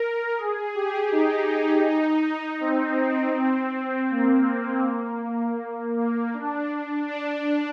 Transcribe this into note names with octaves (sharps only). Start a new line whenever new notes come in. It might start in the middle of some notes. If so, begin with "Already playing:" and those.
Already playing: A#4
G#4
G4
D#4
D#4
C4
C4
A#3
A#3
D4
D4
D4